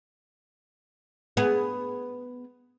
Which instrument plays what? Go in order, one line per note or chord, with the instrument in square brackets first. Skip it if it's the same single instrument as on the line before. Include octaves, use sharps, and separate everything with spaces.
[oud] B3 G#4